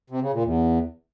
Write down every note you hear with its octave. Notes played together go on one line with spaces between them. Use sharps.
C3
C#3
A#2
E2